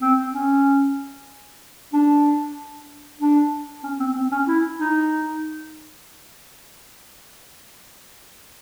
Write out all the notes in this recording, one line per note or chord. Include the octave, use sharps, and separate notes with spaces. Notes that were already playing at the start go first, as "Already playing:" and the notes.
C4
C#4
D4
D4
C#4
C4
C4
C#4
E4
D#4